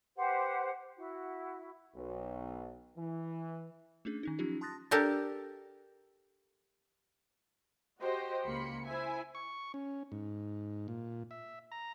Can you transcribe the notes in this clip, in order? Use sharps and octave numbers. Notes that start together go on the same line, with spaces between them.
G4 B4 C5 F#5
E4 F#4
B1
E3
A3 C#4 D4 G#4
D#3 C#4 D#4
F3 F#3 C#4 D#4 F4 G4
A5 C6 D#6 F#6 A6 A#6
D4 G4 A4 A#4
F#4 G4 C5 D#5 G5
C#2 A#3 B5 C6 C#7
E4 C5 E5 G#5
C#6
C#4
G#2
A#2
E5
A#5